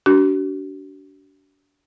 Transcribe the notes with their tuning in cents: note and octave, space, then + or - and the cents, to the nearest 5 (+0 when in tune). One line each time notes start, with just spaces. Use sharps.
D4 -30 F#4 +40